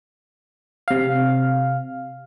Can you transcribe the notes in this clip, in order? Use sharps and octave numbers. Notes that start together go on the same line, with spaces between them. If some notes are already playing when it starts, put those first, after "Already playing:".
C3 F5